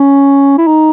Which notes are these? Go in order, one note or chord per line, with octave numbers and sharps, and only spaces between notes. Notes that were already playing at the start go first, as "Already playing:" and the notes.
Already playing: C#4
E4
D#4